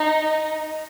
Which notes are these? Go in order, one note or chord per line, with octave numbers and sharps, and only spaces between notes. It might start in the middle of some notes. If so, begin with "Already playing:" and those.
Already playing: D#4